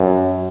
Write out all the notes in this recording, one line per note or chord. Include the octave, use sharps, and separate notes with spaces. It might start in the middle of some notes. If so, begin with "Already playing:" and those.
Already playing: F#2